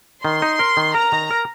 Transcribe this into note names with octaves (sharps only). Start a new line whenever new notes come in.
D#3 C6
D#4
A#4
D#3
A#4 A#5
D#3
A#4